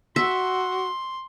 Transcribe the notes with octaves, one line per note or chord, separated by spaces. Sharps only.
F#4 E5 C6